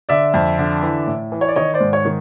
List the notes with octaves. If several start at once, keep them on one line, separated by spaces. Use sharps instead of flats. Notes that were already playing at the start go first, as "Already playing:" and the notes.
D3 D5 E5
F2
D3
E3
A2
E3
C#5
D5
D#3 C#5 D#5
C5 D5
G#2
C#5
D#3